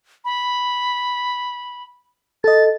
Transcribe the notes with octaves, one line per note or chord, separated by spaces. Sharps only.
B5
A4 D#5 A6